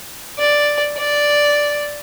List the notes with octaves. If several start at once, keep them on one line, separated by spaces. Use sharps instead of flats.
D5
D5